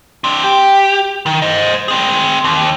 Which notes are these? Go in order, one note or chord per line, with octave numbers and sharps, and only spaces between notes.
C4 D4
G4
D#3
C5 D#5
C4 G#4
D#2